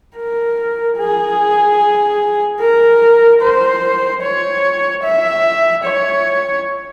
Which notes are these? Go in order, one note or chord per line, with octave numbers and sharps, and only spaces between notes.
A#4
G#4
A#4
C5
C#5
E5
C#5